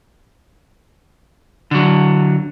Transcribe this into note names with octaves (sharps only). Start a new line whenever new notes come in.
D3 F#3